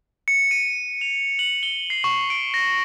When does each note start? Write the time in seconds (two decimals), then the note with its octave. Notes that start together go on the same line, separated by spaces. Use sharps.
0.28 C#7
0.51 D#7
1.01 F7
1.39 F#7
1.63 G7
1.90 C7
2.04 C#6
2.30 D7
2.54 A#6